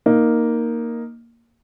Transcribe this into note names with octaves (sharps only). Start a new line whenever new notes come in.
A#3 D#4